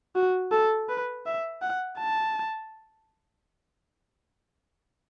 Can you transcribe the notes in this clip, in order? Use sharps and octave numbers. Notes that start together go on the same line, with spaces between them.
F#4
A4
B4
E5
F#5
A5